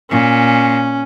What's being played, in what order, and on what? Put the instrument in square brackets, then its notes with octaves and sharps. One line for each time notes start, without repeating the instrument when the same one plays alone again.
[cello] A#2 [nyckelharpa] C#4